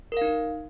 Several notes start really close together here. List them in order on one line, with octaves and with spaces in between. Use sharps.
A#4 F5 D#4